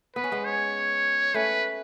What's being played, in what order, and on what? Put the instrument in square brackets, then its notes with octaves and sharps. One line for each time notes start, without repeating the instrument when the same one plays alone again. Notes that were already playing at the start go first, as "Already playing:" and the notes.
[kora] B3 [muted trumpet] B4
[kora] C#4
G#3 B3
[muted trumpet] C#5
[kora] A3 C#4 [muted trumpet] B4